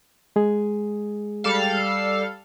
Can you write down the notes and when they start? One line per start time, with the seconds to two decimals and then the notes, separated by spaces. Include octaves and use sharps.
0.36 G#3 G#4
1.44 G3 A4 F5